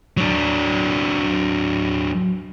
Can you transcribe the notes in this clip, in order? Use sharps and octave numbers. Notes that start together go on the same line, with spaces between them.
F#3 D4